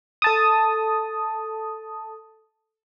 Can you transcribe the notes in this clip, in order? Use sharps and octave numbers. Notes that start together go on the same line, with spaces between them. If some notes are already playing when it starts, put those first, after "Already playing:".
A4 A5 D#6